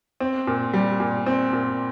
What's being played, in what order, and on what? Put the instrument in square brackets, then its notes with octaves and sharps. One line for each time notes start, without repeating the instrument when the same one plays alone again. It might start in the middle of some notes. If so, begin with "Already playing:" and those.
[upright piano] C4
A#2
G3
A#2
C4
A#2